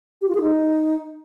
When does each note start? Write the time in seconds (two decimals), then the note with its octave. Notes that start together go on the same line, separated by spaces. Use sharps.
0.22 G4
0.28 F4
0.35 G#4
0.42 D#4